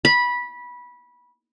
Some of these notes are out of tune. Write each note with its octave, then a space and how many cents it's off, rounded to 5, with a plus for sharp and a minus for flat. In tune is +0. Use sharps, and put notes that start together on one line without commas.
B5 -15